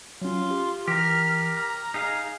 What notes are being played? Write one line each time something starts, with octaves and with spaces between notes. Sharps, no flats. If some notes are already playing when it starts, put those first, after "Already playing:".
F#3 C#4 F4
G4
E3 G4 A#4 F6
A#5 F6
D#4 G#4 F5